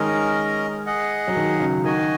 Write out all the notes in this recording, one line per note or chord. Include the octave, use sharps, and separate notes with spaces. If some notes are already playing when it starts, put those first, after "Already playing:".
Already playing: D#3 G#3 C#4 A#4 D#5
G#4 D#5 F#5
F#3
D#3
C#3 F#3
D#3 F#4 D#5 G#5